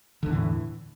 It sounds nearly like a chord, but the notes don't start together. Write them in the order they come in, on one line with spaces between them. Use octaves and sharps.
D3 E2 E3 A2